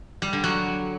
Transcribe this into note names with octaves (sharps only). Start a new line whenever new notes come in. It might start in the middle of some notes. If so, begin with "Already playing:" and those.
G3
D3
F#3